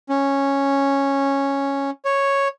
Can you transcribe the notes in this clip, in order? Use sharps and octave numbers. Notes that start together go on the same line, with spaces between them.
C#4
C#5